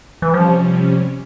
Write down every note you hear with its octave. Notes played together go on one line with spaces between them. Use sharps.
E3
C3 F3 G3 C#4